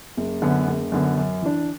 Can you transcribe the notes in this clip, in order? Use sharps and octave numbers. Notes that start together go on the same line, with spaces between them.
F#1
F#2 D3 B3
F#1
F#2 D3 B3
F#2
E3 D4